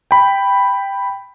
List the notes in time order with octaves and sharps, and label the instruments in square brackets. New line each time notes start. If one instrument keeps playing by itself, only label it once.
[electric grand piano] G5 B5